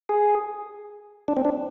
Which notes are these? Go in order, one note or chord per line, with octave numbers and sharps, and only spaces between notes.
G#4
D4
C4
D4